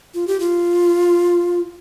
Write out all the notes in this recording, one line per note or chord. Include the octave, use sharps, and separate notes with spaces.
F4
G4
F4